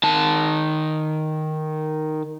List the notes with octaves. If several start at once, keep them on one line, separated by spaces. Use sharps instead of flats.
D#3 A5